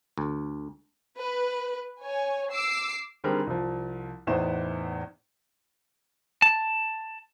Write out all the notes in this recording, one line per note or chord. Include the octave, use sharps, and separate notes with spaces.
D2
B4
C#5 G#5
D6 E6 C7
D3 D#3 G3 C4 G#4 A#4
C2 F3
E2 A2 B3 D#4 C5 E7
A5